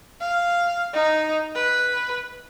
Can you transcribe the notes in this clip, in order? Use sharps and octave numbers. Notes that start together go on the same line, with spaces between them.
F5
D#4
B4